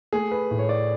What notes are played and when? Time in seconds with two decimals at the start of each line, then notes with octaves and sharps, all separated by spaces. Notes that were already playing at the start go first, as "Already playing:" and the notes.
0.13 A3 G#4
0.31 B4
0.51 A2
0.59 C#5
0.69 D5